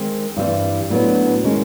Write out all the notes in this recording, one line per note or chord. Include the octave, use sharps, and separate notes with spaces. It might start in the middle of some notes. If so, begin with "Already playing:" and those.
Already playing: D#3 G#3 C4
G2 E3 G3 C4
A2 F#3 B3 D4
D#3 G#3 C#4